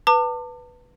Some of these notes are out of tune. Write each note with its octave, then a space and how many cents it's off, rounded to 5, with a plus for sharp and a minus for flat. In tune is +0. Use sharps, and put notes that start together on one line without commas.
B4 +0 A5 +35 D6 +35